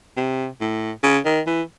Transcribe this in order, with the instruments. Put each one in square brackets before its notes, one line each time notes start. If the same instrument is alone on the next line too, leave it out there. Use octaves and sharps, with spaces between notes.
[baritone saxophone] C3
A2
C#3
D#3
E3